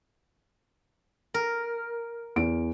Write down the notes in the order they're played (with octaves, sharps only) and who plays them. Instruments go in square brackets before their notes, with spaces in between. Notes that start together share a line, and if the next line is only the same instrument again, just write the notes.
[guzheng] A#4
[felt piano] E2 D7